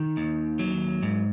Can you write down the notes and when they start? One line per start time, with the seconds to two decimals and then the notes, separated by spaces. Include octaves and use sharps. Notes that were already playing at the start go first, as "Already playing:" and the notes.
Already playing: D#3
0.17 D#2
0.59 F#3
1.03 G#2